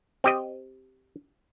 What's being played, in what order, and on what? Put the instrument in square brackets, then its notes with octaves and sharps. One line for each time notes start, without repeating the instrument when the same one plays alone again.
[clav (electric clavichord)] C4 G4 D#5